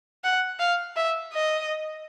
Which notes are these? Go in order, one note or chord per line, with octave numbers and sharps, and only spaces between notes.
F#5
F5
E5
D#5